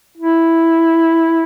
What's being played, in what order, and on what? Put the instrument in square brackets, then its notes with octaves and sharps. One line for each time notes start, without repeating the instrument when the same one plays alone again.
[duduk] E4